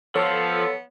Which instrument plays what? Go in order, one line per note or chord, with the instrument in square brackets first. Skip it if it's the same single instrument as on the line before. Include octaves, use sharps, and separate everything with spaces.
[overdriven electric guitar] F3 F4 [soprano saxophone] B3 [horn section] A4 [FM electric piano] C#5